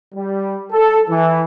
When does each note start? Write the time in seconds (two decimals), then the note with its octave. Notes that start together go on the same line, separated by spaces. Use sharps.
0.14 G3
0.72 A4
1.09 E3